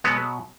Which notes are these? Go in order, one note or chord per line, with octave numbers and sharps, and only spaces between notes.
B2 F#3 G#3 B3